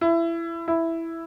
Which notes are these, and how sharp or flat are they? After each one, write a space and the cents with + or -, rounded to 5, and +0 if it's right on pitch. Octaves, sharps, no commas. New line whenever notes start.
E4 +20
E4 +0